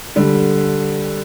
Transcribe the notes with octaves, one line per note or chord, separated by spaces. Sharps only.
D3 G3